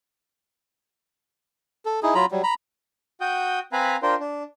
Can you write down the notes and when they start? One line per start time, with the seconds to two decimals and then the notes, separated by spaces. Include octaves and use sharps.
1.86 A4
2.03 D#4 E4 G#4
2.15 F#3 F4 A#5 B5
2.31 F#3 G3
2.44 A#5 B5
3.21 F#4 G5 D#6 G6
3.73 C4 B4 F5 G#5 A#5 B5
4.03 D4 F4 A#4 C5 G5
4.20 D4